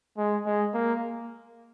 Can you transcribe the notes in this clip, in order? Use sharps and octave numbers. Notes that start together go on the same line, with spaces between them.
G#3
G#3
A#3